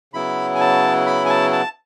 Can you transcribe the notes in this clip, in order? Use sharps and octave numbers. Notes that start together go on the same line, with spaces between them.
C#3 F#3 B3 E4 B5
G#5
A5
B5
G#5
A5
A5